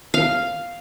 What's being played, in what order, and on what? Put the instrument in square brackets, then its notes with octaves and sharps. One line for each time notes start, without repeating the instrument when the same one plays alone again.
[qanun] F5